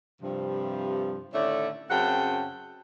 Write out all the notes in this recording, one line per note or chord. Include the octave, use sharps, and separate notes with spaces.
G2 C3 F3
A2 D3 D#3 A3 C#4 D5
F#2 C#3 C4 F#5 G5 A5